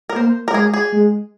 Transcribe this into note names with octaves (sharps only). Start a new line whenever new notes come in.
A#4
A#3 C5
A#4
G#3 G#4
G#4
G#3